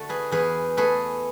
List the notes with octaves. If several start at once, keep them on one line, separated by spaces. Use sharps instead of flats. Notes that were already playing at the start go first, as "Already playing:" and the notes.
Already playing: D3 A3 F#4
G#4 B4
E2 G#4 B4
A3 G#4 B4